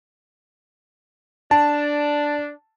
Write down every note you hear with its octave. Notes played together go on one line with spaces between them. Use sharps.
D4 A5